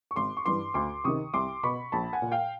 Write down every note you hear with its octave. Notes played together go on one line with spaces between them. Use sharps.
C#6
G#1 C6 D6
C#6
G2 E3 C6 D6
D2 C6 D6
C3 D#3 C#6 D#6
C2 C6 D6
B2 B5 C#6
A#1 A5 B5
F#5 G#5
A#2
F5 G5